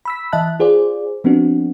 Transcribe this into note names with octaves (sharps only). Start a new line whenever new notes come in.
B5 E6 B6
E3 D#5 E5 A5 F#6
F4 G#4 C5 D5
F3 B3 C4 D4 F#4